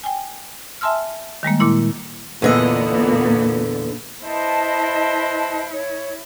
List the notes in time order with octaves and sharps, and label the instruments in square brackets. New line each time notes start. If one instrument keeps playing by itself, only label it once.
[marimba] G5 G#5
E5 G#5 A5 C6 E6 F6
D#3 G3 G#3 A#3
A#2 A#3 E4 C6
[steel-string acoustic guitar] E2 D3 D#5 [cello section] A#2 A#3 B3
[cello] E4 [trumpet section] B4 C5 [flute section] D#5 A5
[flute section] C#5